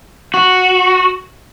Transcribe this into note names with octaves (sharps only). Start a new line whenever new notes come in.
F#4